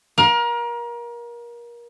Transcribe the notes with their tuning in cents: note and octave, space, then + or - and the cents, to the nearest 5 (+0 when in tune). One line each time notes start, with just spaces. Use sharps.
A#4 +30 F5 +25